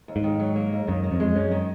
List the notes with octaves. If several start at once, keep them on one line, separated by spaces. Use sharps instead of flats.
D#2
G#2
D#3
F#3
A#3
D#2
F#2 D#3
D#3
F2
G#3
F#2 C#4
D#3